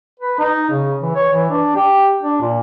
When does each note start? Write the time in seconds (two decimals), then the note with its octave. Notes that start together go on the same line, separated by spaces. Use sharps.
0.20 B4
0.39 D#4
0.70 C#3
1.02 E3
1.15 C#5
1.32 E3
1.50 D4
1.75 G4
2.23 D4
2.41 A#2